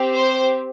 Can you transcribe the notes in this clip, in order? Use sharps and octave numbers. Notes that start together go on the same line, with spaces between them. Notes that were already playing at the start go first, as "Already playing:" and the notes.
Already playing: C4 G4
C5